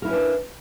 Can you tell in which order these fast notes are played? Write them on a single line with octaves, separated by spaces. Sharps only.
A#4 E4 C#4 B4 D4